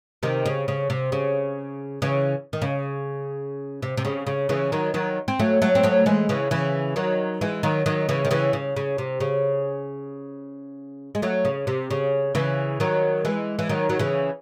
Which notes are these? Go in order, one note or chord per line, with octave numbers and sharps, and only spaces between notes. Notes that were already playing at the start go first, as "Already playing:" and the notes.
C3 D#3
C#3
C#3
C3
C#3
C#3 E3
D#3
C#3
C3
C3
C#3
C#3
C#3 E3
D#3 F#3
D#3 F#3
C4
F#3 A3
F#3 A3
C4
F#3 A3
E3 G#3
C#3 E3
C#3 E3
D#3 F#3
E3 G#3
D#3 F#3
D#3 F#3
C#3 E3
D#3
C#3 E3
C#3
C#3
C3
C#3
G#3
F#3 A3
C#3
C3
C#3
C#3 E3
D#3 F#3
E3 G#3
E3
D#3 F#3
F#3
C#3 E3